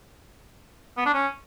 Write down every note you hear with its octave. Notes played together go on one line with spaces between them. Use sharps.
B3
D4
C#4